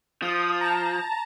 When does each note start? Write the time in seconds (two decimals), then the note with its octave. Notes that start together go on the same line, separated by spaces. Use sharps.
0.22 F3 D#6
0.61 A5 A#5